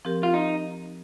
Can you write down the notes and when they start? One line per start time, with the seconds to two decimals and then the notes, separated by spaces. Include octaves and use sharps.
0.05 F3 C4 G4 A#4
0.23 F4
0.34 D#4